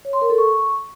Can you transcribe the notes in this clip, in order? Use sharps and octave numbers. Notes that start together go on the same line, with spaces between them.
C#5
C6
A#4
A4
C#6